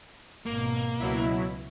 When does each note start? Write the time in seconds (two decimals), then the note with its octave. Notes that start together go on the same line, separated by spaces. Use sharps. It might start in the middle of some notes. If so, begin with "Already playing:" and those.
0.46 G#1 B2 A#3
1.00 C#2 B2 F#3 E4